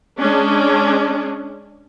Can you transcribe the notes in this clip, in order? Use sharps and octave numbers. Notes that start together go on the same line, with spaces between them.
G#3 C#4 D4